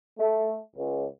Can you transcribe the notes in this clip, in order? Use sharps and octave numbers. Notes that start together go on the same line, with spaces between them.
A3
C#2